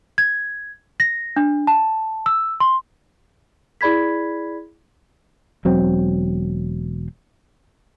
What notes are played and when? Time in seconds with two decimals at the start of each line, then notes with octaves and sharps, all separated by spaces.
0.18 G#6
1.00 A#6
1.36 D4
1.67 A5
2.26 E6
2.60 C6
3.81 E4 G#4 D5 B5 G#6 B6
5.65 E1 F#3 C4